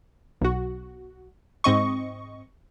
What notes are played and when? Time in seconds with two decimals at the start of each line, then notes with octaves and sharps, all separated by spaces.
0.41 B1 F#4
1.64 G#2 C4 D#5 C#6